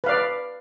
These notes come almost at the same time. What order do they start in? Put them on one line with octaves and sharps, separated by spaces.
B4 F5 D5